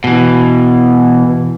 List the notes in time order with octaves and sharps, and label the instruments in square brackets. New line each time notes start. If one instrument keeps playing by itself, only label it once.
[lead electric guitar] B2 E3